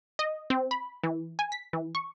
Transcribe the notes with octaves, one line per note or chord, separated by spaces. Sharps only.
D#5
C4
B5
E3
G#5
B6
E3
C#6